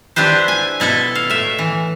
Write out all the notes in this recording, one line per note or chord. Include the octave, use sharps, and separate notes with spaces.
D4 E4 G4 B4 C5
G#5
B2 E4 A4 E5
F5
A2 E5
E3